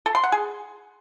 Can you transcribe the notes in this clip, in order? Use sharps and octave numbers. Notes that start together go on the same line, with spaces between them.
A4
C6
F#5
G#4